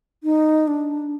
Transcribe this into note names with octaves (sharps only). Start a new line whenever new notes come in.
D#4
D4